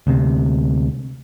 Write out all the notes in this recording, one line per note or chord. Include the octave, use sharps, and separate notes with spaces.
D2 C3